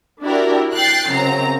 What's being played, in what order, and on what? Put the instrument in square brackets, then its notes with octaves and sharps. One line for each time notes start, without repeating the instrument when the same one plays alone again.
[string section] D4 E4 F#4 G4 A#4
G5 F#6 G6 A6 C7
F#2 C#3 C4 A#5